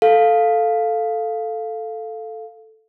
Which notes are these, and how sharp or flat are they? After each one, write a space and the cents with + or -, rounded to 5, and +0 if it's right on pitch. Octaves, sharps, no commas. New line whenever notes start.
A4 +0 F5 +0